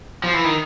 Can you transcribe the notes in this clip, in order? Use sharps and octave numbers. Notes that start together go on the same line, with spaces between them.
F3
E3
D#3